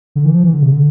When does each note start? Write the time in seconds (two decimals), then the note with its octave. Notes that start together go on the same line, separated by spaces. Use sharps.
0.16 D3
0.25 E3
0.34 F3
0.44 E3
0.53 D3
0.62 C3
0.72 D3